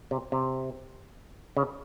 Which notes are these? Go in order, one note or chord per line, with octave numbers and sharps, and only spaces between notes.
C3
C3
C#3